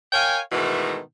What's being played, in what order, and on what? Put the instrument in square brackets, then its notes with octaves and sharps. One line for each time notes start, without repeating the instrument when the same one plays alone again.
[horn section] A#4 C#5 F5 G5 G#5
G#2 B2 D#3 E3 G#3 A3